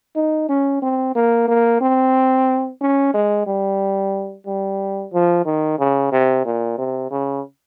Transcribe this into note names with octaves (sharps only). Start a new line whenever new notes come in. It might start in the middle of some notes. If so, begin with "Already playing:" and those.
D#4
C#4
C4
A#3
A#3
C4
C#4
G#3
G3
G3
F3
D#3
C#3
C3
A#2
C3
C#3